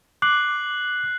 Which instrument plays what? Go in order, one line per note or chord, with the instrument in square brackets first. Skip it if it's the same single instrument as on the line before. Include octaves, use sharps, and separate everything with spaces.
[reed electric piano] D6 [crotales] F#6 C7 F#7